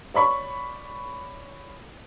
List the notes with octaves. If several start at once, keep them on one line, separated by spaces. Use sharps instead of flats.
C#5 D5 B5 C#6